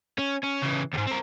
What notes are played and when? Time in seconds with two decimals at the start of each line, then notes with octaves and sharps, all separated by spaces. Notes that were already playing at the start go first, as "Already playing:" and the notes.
0.19 C#4
0.44 C#4
0.63 C#3 E3
0.94 D2 G#2
1.07 C4 A#4